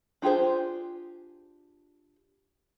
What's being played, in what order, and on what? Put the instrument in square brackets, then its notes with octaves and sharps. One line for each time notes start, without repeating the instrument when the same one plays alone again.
[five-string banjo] D4 F4 G4 G#4 C5